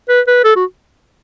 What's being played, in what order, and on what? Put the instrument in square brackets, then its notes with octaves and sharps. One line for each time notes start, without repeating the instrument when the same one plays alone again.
[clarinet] B4
B4
A4
F#4